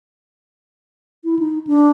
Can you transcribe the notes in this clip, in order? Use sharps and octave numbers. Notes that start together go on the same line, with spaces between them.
E4
D#4
D4